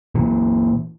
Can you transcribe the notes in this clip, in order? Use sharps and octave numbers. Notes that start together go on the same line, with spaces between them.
A#2 E3